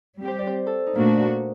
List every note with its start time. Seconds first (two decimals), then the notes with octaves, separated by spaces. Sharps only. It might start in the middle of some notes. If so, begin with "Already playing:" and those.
0.18 G3 C4 G4
0.28 C5
0.38 D5
0.47 C5
0.66 A4
0.86 D#4
0.95 A#2 A3 A#3 D4 F#4